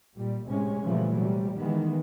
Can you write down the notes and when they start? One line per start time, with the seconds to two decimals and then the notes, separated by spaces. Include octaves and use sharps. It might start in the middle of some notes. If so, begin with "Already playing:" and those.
0.15 A#2 G3
0.45 A2 C3 G#3 C#4
0.83 A#2 C#3 E3 F3 G3 A3
1.17 C3 F#3 G3
1.58 D#3 E3 G#3 B3